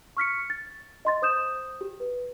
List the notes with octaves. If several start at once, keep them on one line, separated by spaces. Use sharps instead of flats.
C#6 F6 B6 C#7
A6
D#5 C6 A6
C5 D#6 G6 E7
G4
B4